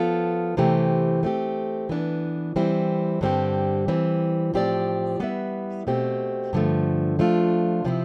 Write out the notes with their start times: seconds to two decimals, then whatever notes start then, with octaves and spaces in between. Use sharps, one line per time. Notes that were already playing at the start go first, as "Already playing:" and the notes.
Already playing: F3 B3 F4 A4
0.57 C3 E3 A3 C4 G4
1.23 A3 C4 G4
1.89 E3 B3 D4
2.56 E3 G3 C4 E4
3.21 G2 D3 G3 C4 G4
3.88 E3 G3 C4
4.54 A2 F3 C4 G4 D5
5.20 G3 B3 E4 B4 E5
5.87 B2 A3 C4 G4
6.53 G2 D3 F3 A3
7.19 F3 A3 D4 F4
7.85 C3 F3 C4 E4